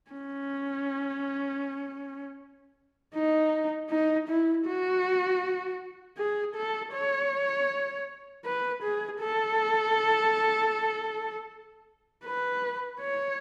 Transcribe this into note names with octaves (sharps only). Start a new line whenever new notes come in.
C#4
D#4
D#4
E4
F#4
G#4
A4
C#5
B4
G#4
A4
B4
C#5